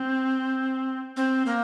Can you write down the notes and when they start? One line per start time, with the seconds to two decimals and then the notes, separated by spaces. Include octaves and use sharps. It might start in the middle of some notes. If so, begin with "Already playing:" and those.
Already playing: C4
1.17 C4
1.46 A#3